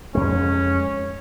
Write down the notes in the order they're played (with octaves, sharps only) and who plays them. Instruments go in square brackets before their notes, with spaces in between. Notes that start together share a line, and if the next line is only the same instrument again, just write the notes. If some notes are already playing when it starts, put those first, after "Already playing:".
[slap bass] F2 G#3 [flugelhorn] C#4